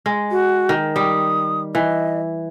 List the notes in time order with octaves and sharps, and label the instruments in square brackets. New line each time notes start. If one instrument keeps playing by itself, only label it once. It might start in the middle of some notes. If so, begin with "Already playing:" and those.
[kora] G#3
[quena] F#4
[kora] D#3
[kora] G3 [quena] D#6
[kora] E3 [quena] D#5